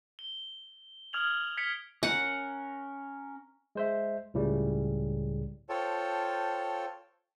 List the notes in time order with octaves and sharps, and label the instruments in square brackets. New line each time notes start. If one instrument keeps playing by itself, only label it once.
[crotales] G7
D#6 F6 G#6 F7 F#7
F6 G#6 B6 C#7 D7 G7
[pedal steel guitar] C#4 A#4 [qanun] F#5
[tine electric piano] G#3 C5 E5
C#2 A2 C#3 G3
[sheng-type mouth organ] F4 A4 C5 C#5 G5 A5